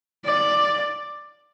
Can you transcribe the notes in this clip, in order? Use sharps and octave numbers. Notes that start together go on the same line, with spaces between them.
D5